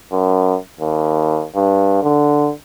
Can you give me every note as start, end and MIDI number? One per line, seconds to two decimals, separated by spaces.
0.12 0.56 42
0.80 1.45 39
1.56 2.01 43
2.03 2.51 50